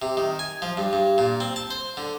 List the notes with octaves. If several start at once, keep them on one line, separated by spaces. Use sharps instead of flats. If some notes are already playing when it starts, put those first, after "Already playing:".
C3
D#3
G#5
F3
G2
G2
A#2
C4
A5
C5
D3